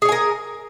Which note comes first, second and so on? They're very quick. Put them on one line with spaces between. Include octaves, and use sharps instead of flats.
G#4 C#5 G#5 A#4